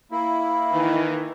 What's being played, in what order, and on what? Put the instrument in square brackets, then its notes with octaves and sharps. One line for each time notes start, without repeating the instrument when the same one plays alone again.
[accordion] A#3 E4
[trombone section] D#3 E3